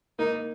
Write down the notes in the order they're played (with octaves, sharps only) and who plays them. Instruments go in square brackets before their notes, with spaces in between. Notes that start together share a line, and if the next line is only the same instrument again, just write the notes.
[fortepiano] A#3 [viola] D#4